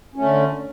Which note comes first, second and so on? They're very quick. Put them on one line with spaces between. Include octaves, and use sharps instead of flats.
C#4 A3 D3